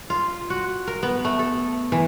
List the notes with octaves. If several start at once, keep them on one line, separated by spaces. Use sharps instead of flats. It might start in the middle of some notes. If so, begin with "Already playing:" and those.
F4
F#4
A#4
B3
A3
A4
E3